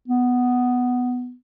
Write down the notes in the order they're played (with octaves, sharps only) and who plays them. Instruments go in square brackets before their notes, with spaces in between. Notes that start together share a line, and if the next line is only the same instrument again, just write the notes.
[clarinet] B3